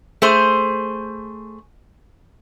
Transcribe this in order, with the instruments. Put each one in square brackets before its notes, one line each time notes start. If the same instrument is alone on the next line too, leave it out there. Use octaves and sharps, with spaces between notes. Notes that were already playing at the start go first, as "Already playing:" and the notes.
[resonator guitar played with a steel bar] A3 G#4 C5